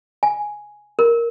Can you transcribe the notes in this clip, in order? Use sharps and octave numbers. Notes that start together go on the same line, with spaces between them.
G#5
A#4